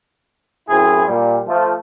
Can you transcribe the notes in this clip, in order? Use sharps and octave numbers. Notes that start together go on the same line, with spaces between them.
F#2 A2 C4 E4 G#4
A#2 G3
F3 A3